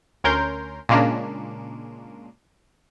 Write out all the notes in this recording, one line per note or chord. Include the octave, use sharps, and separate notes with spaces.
D2 C#4 A#4 C6 G6
A#2 C#3 G#3 A#3 C#4 D4